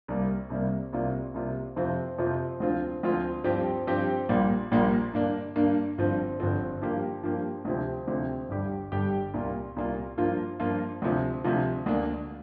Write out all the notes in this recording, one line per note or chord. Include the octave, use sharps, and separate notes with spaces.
C2 C3 G3 A#3
C2 C3 G3 A#3
C2 C3 A#3 F4
C2 C3 A#3 F4
F2 C3 F3 C4 F4
F2 C3 F3 C4 F4
D2 D3 F3 C4 F4
D2 D3 F3 C4 F4
G2 D3 F3 C4 G4
G2 D3 F3 C4 G4
A#1 A#2 G3 A#3
A#1 A#2 G3 A#3
G2 D3 A#3 D4
G2 D3 A#3 D4
G1 G2 F3 C4
G1 G2 F3 C4
G2 F3 A#3 G4
G2 F3 A#3 G4
D2 C3 F3 C4 G4
D2 C3 F3 C4 G4
G1 G2 G3 D4 G4
G1 G2 G3 D4 G4
C2 A#2 A#3 F4
C2 A#2 A#3 F4
G2 F3 A#3 F4
G2 F3 A#3 F4
D2 C3 F3
D2 C3 F3
D2 D3 A#3 D4